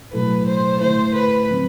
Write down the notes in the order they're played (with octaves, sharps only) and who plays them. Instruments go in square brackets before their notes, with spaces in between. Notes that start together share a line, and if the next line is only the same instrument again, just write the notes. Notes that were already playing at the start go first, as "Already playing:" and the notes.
[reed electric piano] B2 F#3 A3 E4 A4 [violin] B4
[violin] C5
[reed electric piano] D3 A3 E4 [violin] C5
[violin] B4
[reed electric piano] D3 F#3 C4